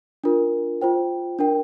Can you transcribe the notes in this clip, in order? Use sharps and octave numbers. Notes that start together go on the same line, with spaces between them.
D4 F4 A#4
F4 C5 G5
D4 A#4 G5